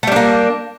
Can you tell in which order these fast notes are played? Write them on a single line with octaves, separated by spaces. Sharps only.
A3 G3 D4 A#3